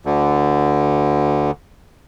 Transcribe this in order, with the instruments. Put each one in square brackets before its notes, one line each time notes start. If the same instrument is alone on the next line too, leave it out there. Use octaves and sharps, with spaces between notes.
[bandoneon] D2 D3